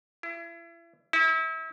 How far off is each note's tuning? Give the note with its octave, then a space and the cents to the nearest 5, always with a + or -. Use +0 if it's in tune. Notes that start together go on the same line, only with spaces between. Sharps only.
E4 +35
E4 -35